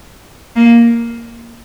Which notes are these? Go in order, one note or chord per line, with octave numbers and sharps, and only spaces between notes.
A#3